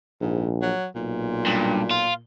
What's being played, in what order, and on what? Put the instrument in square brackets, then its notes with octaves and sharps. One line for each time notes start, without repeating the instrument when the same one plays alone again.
[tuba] A#1 [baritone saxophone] G#2
[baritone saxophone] F#3
[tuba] B1 [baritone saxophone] A#2
[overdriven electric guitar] G2
F4